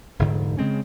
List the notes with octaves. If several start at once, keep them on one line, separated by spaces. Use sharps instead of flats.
F1 D2 G#2 D3
C#3 G#3 C4 C#4